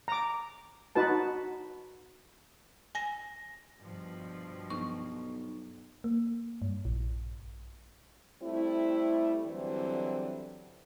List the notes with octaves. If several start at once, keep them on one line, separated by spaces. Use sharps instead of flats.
A#5 D6
D#4 F#4 B4 A5
G#5 A#6
G2 B2 F3
B1 C#6
A#3
G2
A#1
G3 A3 C4 E4
D3 E3 F#3 G3 C4